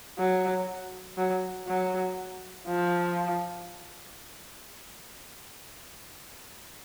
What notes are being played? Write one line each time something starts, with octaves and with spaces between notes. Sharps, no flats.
F#3
F#3
F#3
F3